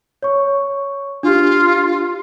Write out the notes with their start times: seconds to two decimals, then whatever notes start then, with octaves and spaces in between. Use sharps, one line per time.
0.23 C#5 C#6
1.23 D4 F4 G4